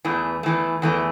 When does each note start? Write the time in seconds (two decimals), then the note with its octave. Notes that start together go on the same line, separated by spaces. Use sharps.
0.05 E2 E3 A3
0.43 E2 E3 A3
0.82 E2 E3 A3